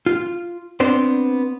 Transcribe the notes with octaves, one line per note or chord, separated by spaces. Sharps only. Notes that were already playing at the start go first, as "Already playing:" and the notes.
F4
B3 C4 D4 C5